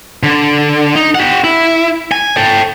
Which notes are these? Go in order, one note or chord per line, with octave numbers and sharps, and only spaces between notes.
D3
D#4
G4 F#5
E4
G#5
A4 G5